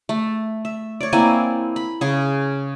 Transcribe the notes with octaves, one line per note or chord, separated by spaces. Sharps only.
A3
E5
C#5 D5
A#3 C4 E4 G#5
B5
C#3 G#4